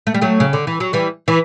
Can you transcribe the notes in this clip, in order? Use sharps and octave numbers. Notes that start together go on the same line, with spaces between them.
A3
G3
F#3 A3
C#3
D3
E3
F#3
E3 G3
E3